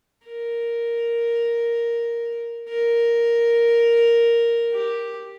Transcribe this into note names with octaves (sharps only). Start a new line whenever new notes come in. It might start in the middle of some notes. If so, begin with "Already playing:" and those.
A#4
A#4
G4